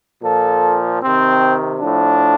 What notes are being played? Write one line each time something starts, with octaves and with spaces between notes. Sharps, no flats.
A#2 F3 A4
C3 D#3 C4
A2 F3 D4